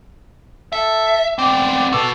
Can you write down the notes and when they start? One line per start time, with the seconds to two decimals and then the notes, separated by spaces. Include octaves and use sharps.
0.73 A4 E5
1.38 B3 C4 D5
1.93 F#4 A4 B4